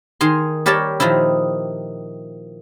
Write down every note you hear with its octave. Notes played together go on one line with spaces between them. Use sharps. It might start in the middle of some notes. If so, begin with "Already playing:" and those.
D#3 D#4 G#4 C6
G3 G4 A#4 C#5 A5
A#2 D#3 F3 D#4 E4